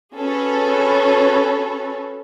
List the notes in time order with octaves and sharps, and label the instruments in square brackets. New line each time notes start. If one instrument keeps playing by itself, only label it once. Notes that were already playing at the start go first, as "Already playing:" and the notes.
[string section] C#4 F#4 G#4 A4 B4 C#5